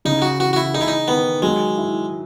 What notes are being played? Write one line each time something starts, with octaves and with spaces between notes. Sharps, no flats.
C#3 D#4
F#4
E3 F#4
F#4
E4
D#4 G#4
E4
D#4
D#3 B3
F#3 G#3
E4